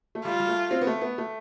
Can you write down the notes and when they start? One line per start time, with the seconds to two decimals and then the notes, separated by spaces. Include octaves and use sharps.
0.15 A3
0.25 G3 F4
0.40 G3
0.48 A3
0.71 C4
0.81 B3
0.87 A3
1.01 B3
1.18 A3